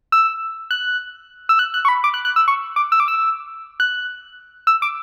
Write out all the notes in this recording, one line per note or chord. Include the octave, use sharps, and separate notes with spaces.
E6
F#6
E6
F#6
F#6
C#6
B5
D6
F#6
F#6
E6
C#6
D6
E6
D6
E6
F#6
E6
D6